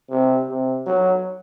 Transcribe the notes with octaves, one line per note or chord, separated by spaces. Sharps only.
C3
C3
F#3